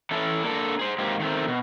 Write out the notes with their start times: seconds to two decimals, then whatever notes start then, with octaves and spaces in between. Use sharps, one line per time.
0.11 E3 C#4 E4 A4
0.43 A#3 D4 A4
0.79 G#4 C5
0.98 G#2 A#3 C4 G4
1.20 D#3 A3 C4
1.48 B2